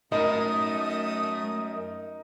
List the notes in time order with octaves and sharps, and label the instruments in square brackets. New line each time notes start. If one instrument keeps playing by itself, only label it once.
[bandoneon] F#2 [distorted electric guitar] A3 B5 [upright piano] D#4 A#4 [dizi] D#6